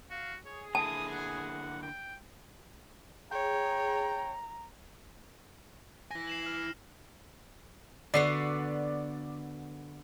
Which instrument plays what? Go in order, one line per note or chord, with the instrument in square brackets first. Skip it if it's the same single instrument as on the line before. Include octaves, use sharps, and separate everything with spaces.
[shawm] F#4 [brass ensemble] F5
[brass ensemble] G#4 [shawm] C#5
[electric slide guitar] D3 A#3 E4 [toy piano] A5 [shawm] D#6
[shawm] F#5
G5
[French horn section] G#4 [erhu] C#5 [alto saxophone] G5 [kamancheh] A#5
[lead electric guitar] E4 G#5 [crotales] A#6
[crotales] C7 E7 F#7
F6
[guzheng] D3 B3 F#4 [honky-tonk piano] D5 C7